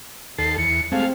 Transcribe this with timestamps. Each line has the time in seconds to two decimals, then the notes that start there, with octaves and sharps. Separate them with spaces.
0.38 D#2 A4 C7
0.58 E2 C#7
0.92 G#3 A3 C4 F5